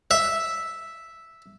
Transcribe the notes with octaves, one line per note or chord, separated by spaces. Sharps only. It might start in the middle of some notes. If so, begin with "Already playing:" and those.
E5